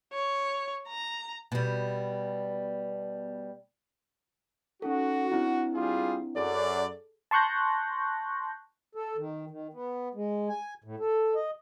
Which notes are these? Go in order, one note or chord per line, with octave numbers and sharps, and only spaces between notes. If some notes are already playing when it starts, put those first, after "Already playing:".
C#5
A#5
B2 G3
C#4 D#4 F#4 A4
C4 D4 E4
G3 F4 G#4
F#2 G#4 A4 D5
A5 C6 C#6 F#6 G6 A#6
A4
D#3
D#3
B3
G#3
G#5
A2
A4
D#5